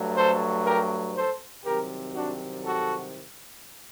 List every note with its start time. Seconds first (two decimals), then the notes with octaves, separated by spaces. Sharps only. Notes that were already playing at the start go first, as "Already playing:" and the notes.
Already playing: G2 F#3 A3
0.15 A4 C5
0.65 G4 A#4
1.15 A4 C5
1.64 C2 C3 D#3 F#3 G4 A#4
2.15 D4 F#4
2.64 F#4 A4